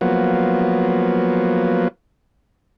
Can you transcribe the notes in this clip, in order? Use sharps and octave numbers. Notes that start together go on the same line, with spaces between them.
F3 F#3 A#3 B3